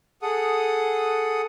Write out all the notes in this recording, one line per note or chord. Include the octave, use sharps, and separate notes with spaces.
G#4 A4 F#5 D#6